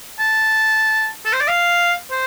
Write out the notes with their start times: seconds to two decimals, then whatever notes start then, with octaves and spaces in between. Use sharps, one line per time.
0.19 A5
1.26 A4
1.33 C5
1.40 D5
1.48 F5
2.11 C5